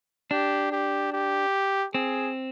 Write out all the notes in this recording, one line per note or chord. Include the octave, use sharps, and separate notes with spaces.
D4 G4
G4
G4
C4 G#4